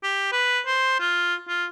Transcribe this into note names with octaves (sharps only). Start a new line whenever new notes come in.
G4
B4
C5
F4
F4